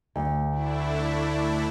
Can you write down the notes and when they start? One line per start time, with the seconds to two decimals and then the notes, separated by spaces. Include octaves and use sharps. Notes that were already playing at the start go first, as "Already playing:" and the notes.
0.16 D2
0.50 A3 D4 E4